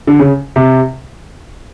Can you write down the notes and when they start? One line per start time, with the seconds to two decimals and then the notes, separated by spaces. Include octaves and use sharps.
0.07 D3
0.19 C#3
0.56 C3